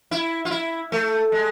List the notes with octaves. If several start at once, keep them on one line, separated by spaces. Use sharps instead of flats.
E4
F4
E4
A3
G#3